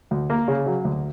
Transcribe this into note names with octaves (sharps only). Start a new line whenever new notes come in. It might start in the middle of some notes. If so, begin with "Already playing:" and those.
D2
A#3
C#3
F#3
D2